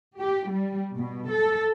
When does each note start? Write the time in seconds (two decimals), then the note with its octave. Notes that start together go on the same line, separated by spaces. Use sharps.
0.20 G4
0.51 G3
0.97 B2
1.30 A4